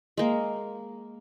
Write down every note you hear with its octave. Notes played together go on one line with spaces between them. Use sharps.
G#3 A#3